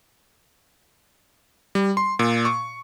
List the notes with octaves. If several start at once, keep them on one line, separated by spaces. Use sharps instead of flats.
G3
C6
A#2
C#6